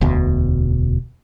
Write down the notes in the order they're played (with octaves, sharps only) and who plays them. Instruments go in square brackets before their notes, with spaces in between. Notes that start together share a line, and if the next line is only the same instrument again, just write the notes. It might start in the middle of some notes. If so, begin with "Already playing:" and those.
[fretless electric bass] E1 D2 B2